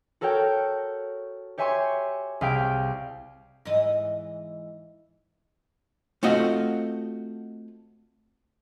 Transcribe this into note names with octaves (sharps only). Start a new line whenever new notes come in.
F#4 A4 A#4 C#5 G5
G4 C#5 E5 G#5 C6 C#6
C2 G#4 F5 G5 B6 D7
G#2 E3 D#5
A3 C4 F4 F#4 D#5